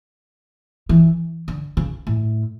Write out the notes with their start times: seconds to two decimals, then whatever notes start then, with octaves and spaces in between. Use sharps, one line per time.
0.89 E3
1.48 D3
1.77 C#3
2.07 A2